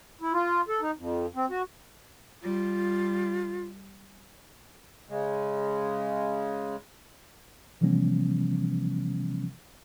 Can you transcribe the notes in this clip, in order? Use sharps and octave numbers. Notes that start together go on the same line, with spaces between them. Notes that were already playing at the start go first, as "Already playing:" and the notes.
E4
F4
A4
D#4
F2
C4
F#4
G3 F4
C#3 G#3
C3 E3 F3 G3 B3 C#4